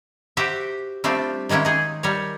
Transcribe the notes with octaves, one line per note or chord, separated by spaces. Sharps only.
F#4 G4 C5 E5 G5
G3 A3 C4 D4 F4
D#3 G#3 A#3 C#4 E4
D#4 G#4
G3 A#4 C#5